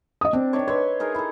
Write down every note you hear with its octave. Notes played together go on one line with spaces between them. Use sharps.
D#5 D#6
C4 D4
D#3 D4 C#5
B4 C#5 E5 C6
D#4 G#4 A#4
E4 A4